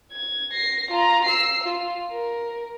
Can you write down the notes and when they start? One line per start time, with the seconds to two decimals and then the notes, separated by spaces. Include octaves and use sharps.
0.12 G#6
0.53 A#6 C7
0.90 F4 A#5
1.24 E6 C7
1.64 F4
2.11 A#4